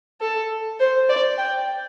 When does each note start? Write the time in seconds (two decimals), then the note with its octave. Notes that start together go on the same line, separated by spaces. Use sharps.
0.21 A4
0.80 C5
1.09 D5
1.38 G5